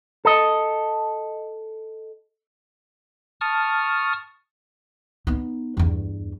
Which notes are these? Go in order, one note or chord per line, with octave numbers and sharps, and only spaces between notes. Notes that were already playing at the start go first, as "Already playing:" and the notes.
A4 D#5
A5 C#6 D#6 F6
B3 D#4
E2 G2